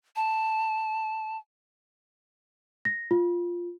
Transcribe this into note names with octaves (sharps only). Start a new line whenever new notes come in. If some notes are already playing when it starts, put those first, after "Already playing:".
A5
A#6
F4